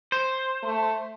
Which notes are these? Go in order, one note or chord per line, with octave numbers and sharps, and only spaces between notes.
C5
A3